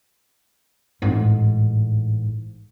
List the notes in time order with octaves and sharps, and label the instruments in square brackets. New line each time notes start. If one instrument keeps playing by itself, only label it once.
[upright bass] A1 G#2